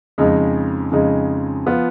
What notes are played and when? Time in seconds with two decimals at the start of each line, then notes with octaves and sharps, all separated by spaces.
0.18 F2 C#3 G#3 D#4
0.92 F2 C#3 G#3 D#4
1.66 F3 B3 F4